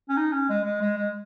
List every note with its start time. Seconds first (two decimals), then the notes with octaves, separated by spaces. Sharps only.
0.09 C#4
0.17 D#4
0.32 C#4
0.49 G#3
0.64 G#3
0.81 G#3
0.98 G#3